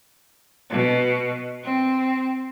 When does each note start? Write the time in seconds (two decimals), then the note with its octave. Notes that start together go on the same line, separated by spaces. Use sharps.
0.70 B2
1.64 C4